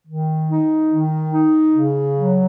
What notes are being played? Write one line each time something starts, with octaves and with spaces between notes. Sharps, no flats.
D#3
D#4
D#3
D#4
C#3
F#3